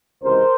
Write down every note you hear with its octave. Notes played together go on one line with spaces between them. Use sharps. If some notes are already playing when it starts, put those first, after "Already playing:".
C#2 C3 E3 G#3 A#4 C5